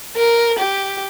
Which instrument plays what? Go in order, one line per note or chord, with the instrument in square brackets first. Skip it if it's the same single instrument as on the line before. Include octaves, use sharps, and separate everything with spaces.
[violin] A#4
G4